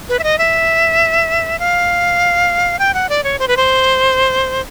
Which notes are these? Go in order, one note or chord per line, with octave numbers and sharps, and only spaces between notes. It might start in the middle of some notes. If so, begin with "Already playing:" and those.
B4
E5
D#5
E5
F5
G5
F#5
D5
C#5
C5
B4
C5